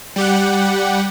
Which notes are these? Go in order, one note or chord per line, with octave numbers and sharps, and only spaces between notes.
G3 G4 F#5